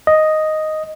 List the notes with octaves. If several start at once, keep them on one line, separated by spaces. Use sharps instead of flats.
D#5